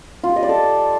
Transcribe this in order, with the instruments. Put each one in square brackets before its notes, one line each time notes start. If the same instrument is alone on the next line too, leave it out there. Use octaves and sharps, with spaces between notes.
[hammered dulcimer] F4
G4
D#5
D5
A4